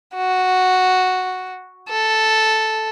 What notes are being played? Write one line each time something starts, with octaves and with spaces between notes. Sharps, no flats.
F#4
A4